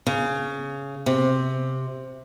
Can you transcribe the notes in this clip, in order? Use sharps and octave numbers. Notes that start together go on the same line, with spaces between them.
C#3
C3